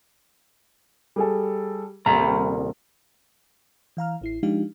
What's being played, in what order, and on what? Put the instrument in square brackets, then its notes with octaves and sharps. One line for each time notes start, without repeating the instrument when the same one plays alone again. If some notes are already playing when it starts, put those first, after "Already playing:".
[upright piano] G3 G#4 A4
[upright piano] D#1 [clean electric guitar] C2 A#5
[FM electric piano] E3 F5 A#5 F6
A1 E4 C7
F3 G#3 D4 D#4 G4 F5